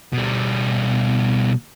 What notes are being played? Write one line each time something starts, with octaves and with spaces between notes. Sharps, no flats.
B2 G3